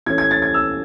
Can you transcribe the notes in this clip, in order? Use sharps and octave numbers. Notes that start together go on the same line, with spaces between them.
E3 A3 C#4 G#6
G#6
A6
G#6
E6